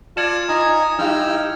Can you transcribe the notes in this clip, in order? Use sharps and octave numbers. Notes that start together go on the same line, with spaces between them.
F4 D5 A5 F6 G#6 C#7 E7
D#4 D#5 G#5 A#5
G2 D#4 E4 G4 G5 E6 F6